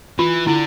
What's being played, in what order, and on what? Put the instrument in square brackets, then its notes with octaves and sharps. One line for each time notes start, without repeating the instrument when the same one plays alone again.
[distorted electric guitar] E3 [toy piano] F4
[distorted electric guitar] D3 [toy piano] E4